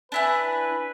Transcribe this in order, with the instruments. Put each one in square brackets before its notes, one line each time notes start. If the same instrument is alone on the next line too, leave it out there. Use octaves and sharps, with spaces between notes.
[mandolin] D4 E4 G#5 [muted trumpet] B4